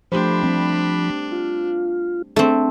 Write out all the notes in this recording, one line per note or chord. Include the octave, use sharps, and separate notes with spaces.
F3 A3 D4 G4 C5 B5
G3 C4
F4
A3 C4 D4